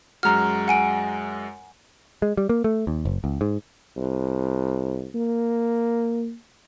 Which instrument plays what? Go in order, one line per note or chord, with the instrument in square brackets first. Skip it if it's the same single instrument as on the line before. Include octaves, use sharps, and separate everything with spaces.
[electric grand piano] F#2 G#3 F#4 [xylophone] A#5 F6
[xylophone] F#5 G#5 D7
[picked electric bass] G#3
G3
A#3
A3
D#2
F#1
C#2
G#2
[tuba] C2
A#3